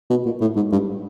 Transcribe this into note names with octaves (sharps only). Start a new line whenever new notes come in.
B2
A#2
A2
G#2
G2